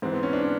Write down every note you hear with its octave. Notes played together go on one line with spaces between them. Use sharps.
G#2 E3 C4
B3
C#4
D4
C#4